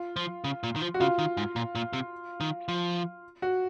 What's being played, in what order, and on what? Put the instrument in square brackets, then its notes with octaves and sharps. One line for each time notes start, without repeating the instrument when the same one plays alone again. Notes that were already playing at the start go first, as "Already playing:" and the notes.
Already playing: [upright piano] F4
[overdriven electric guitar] F3
C#3
A#2
D#3
F3
[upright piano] F#4
[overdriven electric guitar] C#3 [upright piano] F4
[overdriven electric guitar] D#3
G#2
A#2
A#2
C3
D#3
F3
[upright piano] F#4